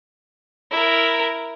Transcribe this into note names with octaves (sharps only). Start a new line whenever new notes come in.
E4 A#4